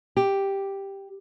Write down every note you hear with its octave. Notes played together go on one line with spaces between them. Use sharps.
G4